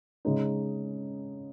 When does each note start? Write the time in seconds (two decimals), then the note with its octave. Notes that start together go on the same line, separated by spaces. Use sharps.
0.25 C#3 G#3 D#4